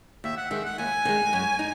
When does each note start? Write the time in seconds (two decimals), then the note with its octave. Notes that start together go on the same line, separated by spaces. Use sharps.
0.24 D#2 E5
0.37 F#5
0.51 D#3 G#3 E5
0.65 F#5
0.78 D#2 G#5
1.05 D#3 G#3
1.33 F#2
1.59 D#4